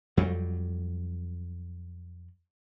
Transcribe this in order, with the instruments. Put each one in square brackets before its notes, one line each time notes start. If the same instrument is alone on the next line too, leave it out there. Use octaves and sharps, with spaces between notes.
[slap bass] F2 F#3 G3